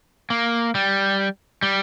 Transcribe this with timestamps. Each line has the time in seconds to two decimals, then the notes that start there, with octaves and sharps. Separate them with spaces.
0.30 A#3
0.75 G3
1.63 G3